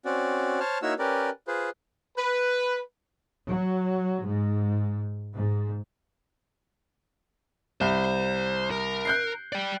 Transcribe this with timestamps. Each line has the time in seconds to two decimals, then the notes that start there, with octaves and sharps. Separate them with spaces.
0.05 C4 C#4 F#4 D5
0.60 C5 C#5 A5 F6
0.82 A#3 D#4 E4 F#4 C#5 E6
0.99 C#4 G4 A#4 B4 D5
1.47 F4 G#4 B4 C5
2.18 B4
3.48 F#3
4.23 G#2
5.33 G#2
7.81 C2 C5
8.71 A#4
9.05 F#6 G6 C7
9.52 D5 G5